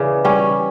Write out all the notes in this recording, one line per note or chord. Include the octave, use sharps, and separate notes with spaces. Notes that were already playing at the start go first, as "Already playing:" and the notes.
Already playing: C#3 E3 D5
G3 C#4